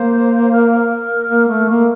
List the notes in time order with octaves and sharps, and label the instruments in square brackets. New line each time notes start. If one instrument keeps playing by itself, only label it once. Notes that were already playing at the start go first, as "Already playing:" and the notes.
Already playing: [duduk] A#3 [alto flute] C5
[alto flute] A#4
[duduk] A#3
A3
A#3